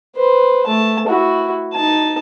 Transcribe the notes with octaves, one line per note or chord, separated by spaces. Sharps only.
B4 C5
A3 A5
E4 F#4
D#4 A5